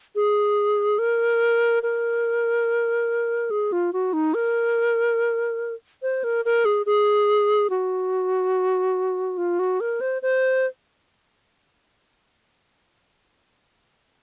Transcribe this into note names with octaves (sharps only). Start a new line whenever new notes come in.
G#4
A#4
A#4
G#4
F4
F#4
D#4
A#4
C5
A#4
A#4
G#4
G#4
F#4
F4
F#4
A#4
C5
C5